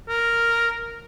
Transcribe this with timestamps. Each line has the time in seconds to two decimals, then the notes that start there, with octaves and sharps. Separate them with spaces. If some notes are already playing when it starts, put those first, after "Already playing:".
0.09 A#4